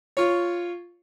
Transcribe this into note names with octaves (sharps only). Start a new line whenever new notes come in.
F4 C#5